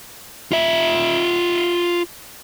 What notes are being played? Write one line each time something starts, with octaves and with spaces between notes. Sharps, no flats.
F4 E5